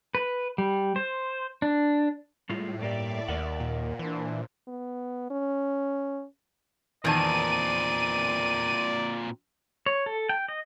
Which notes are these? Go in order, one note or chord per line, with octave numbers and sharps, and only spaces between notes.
B4
G3
C5
D4
A2 G3 G#3 F4
G2 A#3 G4 D5 E5
D#2 A#4 F#5
A#2
E3 D4 C5
B3
C#4
E2 A#2 D#3 C4 D5 A5 D#7
C#5
A4
G5
D#5